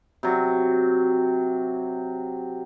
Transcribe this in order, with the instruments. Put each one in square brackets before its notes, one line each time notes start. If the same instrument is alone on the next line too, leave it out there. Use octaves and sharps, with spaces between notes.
[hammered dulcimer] C3 F#3